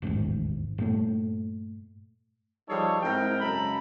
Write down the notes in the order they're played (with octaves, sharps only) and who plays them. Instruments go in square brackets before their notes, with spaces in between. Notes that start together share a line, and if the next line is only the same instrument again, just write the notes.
[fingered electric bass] E1 A1 D#2 G#2
G2 A#2 A3
[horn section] F3 G3 D#4 G#4 A4 C#5
G#2 C4 E4 A#4 G5
F#2 C#3 G#3 A4 A#5 B5